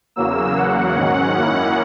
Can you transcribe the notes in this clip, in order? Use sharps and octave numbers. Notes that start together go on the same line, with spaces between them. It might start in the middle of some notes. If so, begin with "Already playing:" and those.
E2 C#3 F#3 A#3 E6
E2 C#3 F#3 A#3 F#5
G#2 D#3 F#3 C#4
F#2 D#3 A#3 C#4 E4